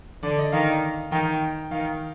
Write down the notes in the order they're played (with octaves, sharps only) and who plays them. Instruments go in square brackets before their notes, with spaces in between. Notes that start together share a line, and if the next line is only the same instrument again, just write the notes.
[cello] D3 [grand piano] D5
[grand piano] D#5
[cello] D#3 [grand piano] F5
[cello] D#3 [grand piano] G5
[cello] D#3 [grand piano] F5